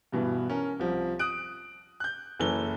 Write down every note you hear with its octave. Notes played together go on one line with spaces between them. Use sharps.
G2 B2 E3
C#4 A#4
C2 F3
D#6 F#6 D7
F#6 G6
F#1 E3 A4 G7